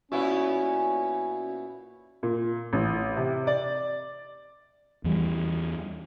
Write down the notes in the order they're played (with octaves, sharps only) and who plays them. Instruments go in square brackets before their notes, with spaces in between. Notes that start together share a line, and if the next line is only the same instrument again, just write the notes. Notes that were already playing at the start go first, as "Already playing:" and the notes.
[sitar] A#2 B3 E4 [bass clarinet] C#4 [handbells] F#4
[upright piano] A#2
A1
C3
D5
[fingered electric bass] E2 E3 G3